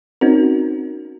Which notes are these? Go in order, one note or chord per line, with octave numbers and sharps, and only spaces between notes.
C4 C#4 D#4 F#4 A#4